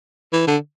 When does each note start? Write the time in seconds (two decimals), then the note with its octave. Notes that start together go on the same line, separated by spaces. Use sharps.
0.33 E3
0.47 D3